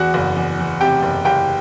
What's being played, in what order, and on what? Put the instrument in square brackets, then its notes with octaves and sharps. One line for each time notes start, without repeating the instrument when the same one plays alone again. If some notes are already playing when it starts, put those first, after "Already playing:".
Already playing: [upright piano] E2 F#4 F#5
F#1
E2
E2
C3 G4 G5
F#1
F#1 G4 G5